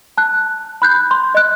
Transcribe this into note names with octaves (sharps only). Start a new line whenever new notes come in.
A5 F#6
B5 F#6 G6
C6
D#5 F#6